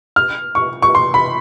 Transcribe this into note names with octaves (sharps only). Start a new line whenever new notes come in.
F6
C#6
C#6
C6
B5